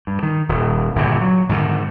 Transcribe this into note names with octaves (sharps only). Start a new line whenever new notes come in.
G2
D#3
D#1
G1 A#2 C#3
F#3
G#2 D3 D#3